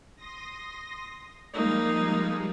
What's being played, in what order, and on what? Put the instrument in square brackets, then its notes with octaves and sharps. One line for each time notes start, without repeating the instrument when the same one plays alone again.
[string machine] C6 D#6 A#6
[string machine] F3 G3 G#3 [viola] A#3 D#4